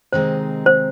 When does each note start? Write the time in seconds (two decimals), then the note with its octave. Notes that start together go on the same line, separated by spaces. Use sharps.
0.13 C3 D#3 G#3 C4 D#4 C5
0.66 C5